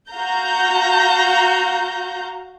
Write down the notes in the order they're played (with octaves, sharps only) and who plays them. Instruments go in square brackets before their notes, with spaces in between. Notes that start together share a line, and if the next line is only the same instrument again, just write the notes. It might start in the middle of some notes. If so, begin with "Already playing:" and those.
[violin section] F#4 F5 A#5 G6